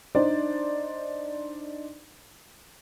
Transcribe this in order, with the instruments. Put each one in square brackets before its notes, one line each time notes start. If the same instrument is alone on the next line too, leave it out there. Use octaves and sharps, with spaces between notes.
[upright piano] D4 D#4 C5 D5